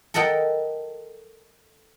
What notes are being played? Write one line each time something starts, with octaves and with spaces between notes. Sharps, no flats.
A4 A#4 D#5 F#5 G5 A5